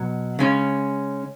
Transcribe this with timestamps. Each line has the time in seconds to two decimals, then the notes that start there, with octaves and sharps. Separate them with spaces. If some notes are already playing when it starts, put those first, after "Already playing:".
Already playing: B2 F#3
0.39 C#3 G#3 C#4